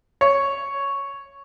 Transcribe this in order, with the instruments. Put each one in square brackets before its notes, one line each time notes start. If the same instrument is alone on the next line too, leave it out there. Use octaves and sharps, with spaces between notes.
[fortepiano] C#5